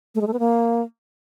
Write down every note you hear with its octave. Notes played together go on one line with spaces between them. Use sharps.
A3
G#3
A3
B3
A#3